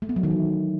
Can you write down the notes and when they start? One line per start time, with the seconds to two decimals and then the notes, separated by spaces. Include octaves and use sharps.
0.02 A3
0.09 B3
0.16 F#3
0.23 D#3
0.31 E3